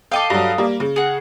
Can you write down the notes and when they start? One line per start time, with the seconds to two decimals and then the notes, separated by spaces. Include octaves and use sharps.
0.12 A4 D#5 F5 G5 D6
0.30 G2 F#3
0.58 G3 A#3
0.80 C#3
0.96 G#4 F#5